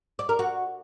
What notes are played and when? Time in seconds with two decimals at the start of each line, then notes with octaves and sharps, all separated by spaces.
0.19 D5
0.29 A#4
0.39 F#4